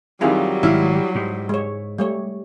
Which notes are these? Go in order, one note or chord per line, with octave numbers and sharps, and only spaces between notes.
F2 D#3 F#3 G3 E4 F4 G#4
G#1 G#2 E4 F5
G#2
G#3 C#5
G3 A3 C#5